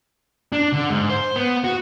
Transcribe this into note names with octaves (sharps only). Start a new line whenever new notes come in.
D4
D3
G#2
C5
B3
F#4